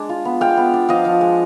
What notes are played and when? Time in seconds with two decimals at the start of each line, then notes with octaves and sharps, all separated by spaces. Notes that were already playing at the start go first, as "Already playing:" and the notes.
Already playing: G#3 D4
0.09 F4
0.25 B3
0.41 G#3 F5 G5
0.57 B3
0.74 D4
0.89 F3 D#5 F5
1.05 F3
1.21 G#3